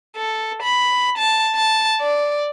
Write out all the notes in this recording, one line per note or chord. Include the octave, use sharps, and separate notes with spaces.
A4
B5
A5
A5
D5